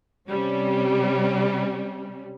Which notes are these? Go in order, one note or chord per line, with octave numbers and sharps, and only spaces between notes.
C3 G3 C#4